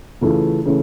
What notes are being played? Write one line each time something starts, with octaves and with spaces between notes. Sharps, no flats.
C#3 E3 A3 C#4 F4
C#3 E3 A3